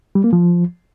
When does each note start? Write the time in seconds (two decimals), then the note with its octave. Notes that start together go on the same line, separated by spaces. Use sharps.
0.15 G3
0.24 A#3
0.33 F3